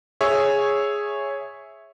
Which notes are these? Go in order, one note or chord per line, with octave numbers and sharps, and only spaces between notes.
G#4 C#5 E5